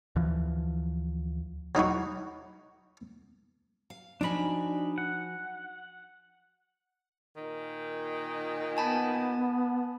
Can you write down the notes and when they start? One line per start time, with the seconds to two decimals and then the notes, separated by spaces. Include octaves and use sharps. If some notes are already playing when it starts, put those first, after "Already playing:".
0.16 D2 E3 F3
1.75 F#3 D#4 E4 F#4
3.90 F5
4.21 F3 D4 D#4 F#4 G#5 B5
4.98 F#5
7.37 A#2 D#3 D#4
8.77 B3 G#5 A5 B5